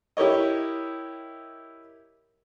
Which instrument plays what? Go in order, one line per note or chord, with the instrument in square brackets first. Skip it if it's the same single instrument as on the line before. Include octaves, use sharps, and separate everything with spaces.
[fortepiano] E4 G4 A#4 C#5 D#5